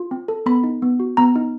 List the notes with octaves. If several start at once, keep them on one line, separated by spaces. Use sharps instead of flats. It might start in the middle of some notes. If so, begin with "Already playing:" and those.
Already playing: F4
C4
A4
B3 B5
D#4
B3
F#4
B3 A#5
D#4